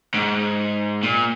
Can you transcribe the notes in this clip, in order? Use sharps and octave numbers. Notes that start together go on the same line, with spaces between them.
G#2
A#2